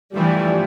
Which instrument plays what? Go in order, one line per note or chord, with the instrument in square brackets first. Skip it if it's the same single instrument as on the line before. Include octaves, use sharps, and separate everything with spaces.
[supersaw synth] G2 F3 A3 E4 [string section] E3 G3